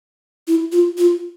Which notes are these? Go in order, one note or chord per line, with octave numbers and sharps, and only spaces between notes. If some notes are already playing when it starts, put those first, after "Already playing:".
E4
F4
F4